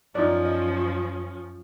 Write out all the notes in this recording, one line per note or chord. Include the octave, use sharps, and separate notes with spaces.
F#2 F3 C#4 D#4 D5
D#5